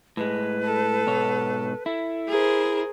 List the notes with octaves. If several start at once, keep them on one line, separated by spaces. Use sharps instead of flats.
A2 G#3 B4
A4
G#2 B2 C#5
E4 A4
G#4 A#4 C5